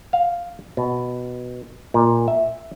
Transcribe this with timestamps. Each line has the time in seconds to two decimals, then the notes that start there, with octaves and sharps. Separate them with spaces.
0.13 F5
0.77 B2
1.94 A#2
2.28 E5